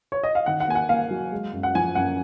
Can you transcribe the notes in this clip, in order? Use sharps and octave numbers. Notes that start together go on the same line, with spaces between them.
C#5
D#5
F5
D#3 F#5
F#5
A#3 G#5
F#5
A#3 F5
F#3
G#3
F#2
F#5
F3 G#5
F#2 F#5